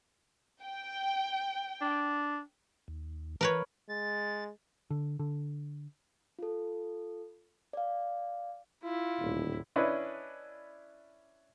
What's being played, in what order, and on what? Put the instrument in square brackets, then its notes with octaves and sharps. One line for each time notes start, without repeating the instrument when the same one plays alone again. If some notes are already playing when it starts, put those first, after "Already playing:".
[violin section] G5
[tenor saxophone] D4
[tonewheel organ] D#2
[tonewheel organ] E3 [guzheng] A#4 B4 C#5
[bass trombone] G#3 [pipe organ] A6
[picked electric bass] D3
D3
[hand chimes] F4 A4
D5 F5
[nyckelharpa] E4 [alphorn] F4
[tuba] D#1 [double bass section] D2 A2 D3
[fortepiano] C#4 D4 E4 B4 D#5